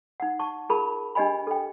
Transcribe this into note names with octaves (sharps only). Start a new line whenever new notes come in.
D#4 F#5
A5 C#6
F4 G#4 A#4 A5 B5
D4 G4 D#5 G#5 B5
A4 G5